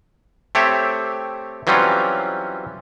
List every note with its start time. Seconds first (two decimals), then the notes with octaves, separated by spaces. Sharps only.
0.55 A3 C4 G4 C#5 E5
1.67 E3 F#3 G3 C4 C#4 F4